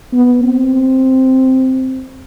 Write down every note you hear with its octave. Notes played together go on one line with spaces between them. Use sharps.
B3
C4